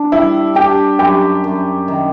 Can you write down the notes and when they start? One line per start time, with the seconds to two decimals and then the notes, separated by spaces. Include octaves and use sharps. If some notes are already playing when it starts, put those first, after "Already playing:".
Already playing: D4
0.12 G3 E4
0.55 D4 G4
0.99 F#2 G4
1.44 F#2
1.88 D#3